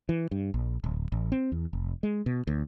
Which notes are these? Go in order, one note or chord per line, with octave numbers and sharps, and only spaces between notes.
E3
G2
A#1
D1
A1
C4
E2
F1
G#3
B2
D2